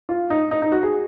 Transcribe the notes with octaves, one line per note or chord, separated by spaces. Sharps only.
F4
D#4
D#4
D#4
F#4
G#4